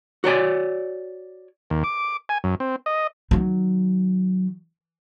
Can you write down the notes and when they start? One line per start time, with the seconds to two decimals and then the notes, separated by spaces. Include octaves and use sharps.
0.24 F#4 C#5 D5 G#5
1.70 D#2
1.84 D6
2.29 G#5
2.44 F#2
2.60 C4
2.86 D#5
3.31 D#3 F#3